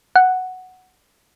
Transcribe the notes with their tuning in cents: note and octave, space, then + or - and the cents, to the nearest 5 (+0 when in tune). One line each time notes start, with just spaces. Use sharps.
F#5 +0